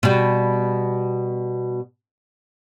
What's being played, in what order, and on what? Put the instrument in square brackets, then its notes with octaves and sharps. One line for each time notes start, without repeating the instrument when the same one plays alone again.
[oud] B2 G3